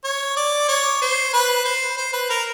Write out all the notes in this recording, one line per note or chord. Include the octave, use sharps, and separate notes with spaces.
C#5
D5
C#5
C5
B4
C5
C5
B4
A#4